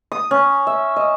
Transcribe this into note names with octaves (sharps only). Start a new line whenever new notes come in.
D#6
C#4
E5
D#5